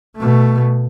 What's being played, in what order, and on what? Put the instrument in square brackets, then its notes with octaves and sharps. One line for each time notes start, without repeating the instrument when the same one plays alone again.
[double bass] B2 A3